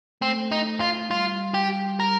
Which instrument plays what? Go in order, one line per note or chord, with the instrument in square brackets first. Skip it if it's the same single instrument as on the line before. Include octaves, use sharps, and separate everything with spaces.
[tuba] A3 [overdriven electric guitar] C4
[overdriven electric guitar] D#4
F4
[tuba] G3 [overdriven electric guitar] F4
[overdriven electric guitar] G4
A#4